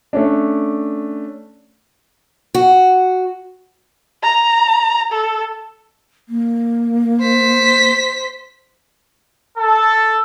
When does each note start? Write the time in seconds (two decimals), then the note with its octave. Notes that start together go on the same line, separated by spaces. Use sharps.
0.13 A3 C#4 D4
2.54 F#4
4.23 A#5
5.12 A4
6.29 A#3
7.21 C5 B6
9.58 A4